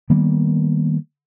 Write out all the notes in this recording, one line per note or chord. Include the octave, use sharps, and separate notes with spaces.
D#3 G3 A#3 B3